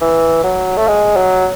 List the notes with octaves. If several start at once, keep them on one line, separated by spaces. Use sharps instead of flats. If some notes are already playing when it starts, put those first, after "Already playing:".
E3
F#3
A3
G#3
F#3